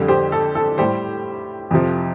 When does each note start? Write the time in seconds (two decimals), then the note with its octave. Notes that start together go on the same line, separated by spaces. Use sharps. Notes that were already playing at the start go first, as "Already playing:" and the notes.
Already playing: F2 D3 G3
0.08 G4 C5
0.32 A4
0.55 A4
0.78 A2 G3 G4 C5
1.71 F2 C3 F3